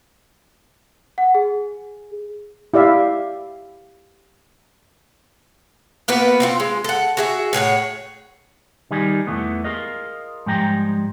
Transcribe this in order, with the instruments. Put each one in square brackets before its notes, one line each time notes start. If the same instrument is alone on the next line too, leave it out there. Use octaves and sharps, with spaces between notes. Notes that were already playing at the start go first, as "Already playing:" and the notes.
[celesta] F#5
G#4
[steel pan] E4 G4 D5 E5 F5
[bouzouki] A#3 B3 F#4 B4
C4 D#4 F4
G#3
A4 F#5
F#4 G#4 E5
A2 G#4 C#5 F#5
[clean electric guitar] D#3 G3 D#4 G#4
E2 E3 A3 B3
F4 G#4 A#4 D#5
G#2 F3 G3 G#3 G5 A#5